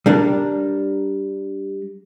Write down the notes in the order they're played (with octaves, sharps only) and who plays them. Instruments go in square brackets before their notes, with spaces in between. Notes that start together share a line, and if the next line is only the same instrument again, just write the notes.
[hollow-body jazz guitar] G3 D4 A#4